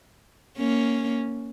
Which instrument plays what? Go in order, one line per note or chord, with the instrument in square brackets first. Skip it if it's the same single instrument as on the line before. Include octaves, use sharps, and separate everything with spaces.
[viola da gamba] A#3 C#4